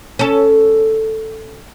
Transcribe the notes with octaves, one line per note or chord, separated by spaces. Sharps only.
C#4 A4